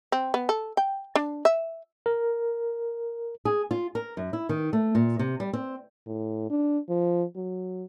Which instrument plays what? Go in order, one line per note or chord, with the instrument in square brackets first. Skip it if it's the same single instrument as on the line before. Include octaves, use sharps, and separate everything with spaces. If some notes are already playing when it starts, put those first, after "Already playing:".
[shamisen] C4
B3
A4
G5
D4
E5
[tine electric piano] A#4
[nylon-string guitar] G#4
F4
A#4
F#2
E4
D#3
A3
A#2
C3
G3
C4
[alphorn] A2
D4
F3
F#3